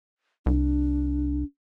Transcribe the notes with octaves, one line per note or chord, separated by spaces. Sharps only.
C2 D4